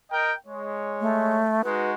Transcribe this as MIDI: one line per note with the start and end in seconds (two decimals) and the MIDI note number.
0.12 0.34 70
0.12 0.34 75
0.12 0.34 79
0.47 1.42 56
0.47 1.42 73
1.01 1.62 57
1.64 1.93 56
1.64 1.93 63
1.64 1.93 66
1.64 1.90 71